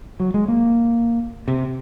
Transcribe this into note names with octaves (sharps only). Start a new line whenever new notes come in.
F#3
G#3
A#3
C3